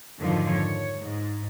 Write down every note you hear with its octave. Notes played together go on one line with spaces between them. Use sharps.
F2 G#2 D3 D#3 F3 F#3
C#5
G#2